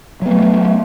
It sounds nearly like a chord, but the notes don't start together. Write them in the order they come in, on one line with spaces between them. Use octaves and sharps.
F#3 B3 A3